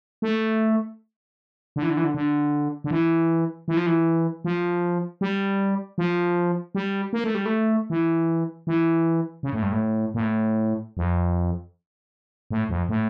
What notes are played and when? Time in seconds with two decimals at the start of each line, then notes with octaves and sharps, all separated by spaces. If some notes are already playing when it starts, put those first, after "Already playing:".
0.22 A3
1.76 D3
1.83 E3
1.90 D3
1.97 E3
2.04 D3
2.14 D3
2.84 D3
2.91 E3
3.68 E3
3.77 F3
3.86 E3
4.45 F3
5.21 G3
5.98 F3
6.75 G3
7.13 A#3
7.24 A3
7.35 G3
7.46 A3
7.90 E3
8.67 E3
9.43 C#3
9.53 A2
9.62 G2
9.72 A2
10.14 A#2
10.20 A2
10.97 F2
12.51 A2
12.69 F2
12.89 A2